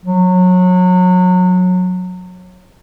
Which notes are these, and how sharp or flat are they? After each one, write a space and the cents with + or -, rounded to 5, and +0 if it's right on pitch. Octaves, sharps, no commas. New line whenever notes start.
F#3 -25